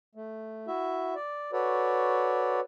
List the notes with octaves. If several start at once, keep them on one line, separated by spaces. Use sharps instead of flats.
A3
E4 F#4 E5
D5
F#4 A4 B4 C#5 D5